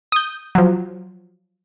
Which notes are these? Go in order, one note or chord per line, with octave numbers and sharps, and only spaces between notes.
D#6 G6
F3 F#3